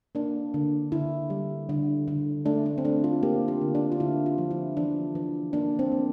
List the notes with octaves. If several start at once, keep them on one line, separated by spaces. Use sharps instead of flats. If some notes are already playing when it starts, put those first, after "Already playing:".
A#3 D4
D3
D3 E4
G3
D3
D3
A3 D4
D4
C4
A3 D4
F4
A#3 G4
F4
D3
D4
F4
D3 E4
F4
F3
E4
E3 D4
E3
A#3 D4
C4
A#3